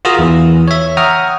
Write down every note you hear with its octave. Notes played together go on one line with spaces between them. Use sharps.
F4 F#4 G#4 A#4 A#5 D#6
E2 E3
C#5 E5
F#5 G5 A#5 C#6 D#6 F6